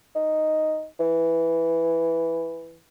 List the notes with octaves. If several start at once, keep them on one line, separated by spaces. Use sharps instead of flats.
D#4
E3